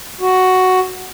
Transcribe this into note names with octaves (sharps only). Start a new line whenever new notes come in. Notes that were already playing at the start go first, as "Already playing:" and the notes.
F#4